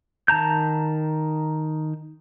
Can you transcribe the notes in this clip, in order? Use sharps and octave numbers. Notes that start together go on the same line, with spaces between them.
D#3 A5 A#5 G6